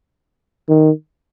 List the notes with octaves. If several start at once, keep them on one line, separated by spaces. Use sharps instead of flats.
D#3